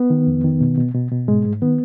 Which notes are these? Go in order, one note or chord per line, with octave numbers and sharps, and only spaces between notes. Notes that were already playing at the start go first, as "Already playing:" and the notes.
Already playing: B3
D#3
F2
D#3
B2
B2
B2
B2
G#2 G#3
G#2
D#3 B3